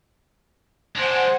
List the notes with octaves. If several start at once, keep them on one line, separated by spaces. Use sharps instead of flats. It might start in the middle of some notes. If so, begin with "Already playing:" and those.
G#3 D4 C5 F#5 G#5